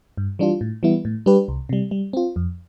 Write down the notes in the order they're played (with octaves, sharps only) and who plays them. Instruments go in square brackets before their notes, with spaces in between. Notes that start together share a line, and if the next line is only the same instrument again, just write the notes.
[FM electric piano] G2
E3 G3 D4 F4
A2
E3 G3 B3 E4
A2
G3 D4 G4 B4
C2
C3 G3
G3
C4 F4
F2